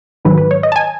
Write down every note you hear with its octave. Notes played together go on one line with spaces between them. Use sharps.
G#2 D#3 F#3 B4
B4
C#5
D#5
A5
G#5